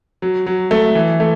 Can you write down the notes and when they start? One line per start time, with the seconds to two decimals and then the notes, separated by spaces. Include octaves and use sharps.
0.22 F#3
0.46 F#3
0.71 A3
0.95 E3
1.20 A3